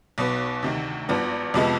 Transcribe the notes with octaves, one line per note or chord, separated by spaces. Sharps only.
B1 B2 B3
D2 C3 D#3
G#1 G2 F3 B3
F2 C3 F3 G#3 B3